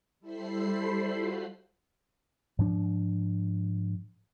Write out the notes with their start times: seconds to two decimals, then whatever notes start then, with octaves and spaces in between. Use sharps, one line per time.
0.20 G3 E4 A4 C5 B5 C7
1.15 F4 F#4
2.59 G#2 F3 D4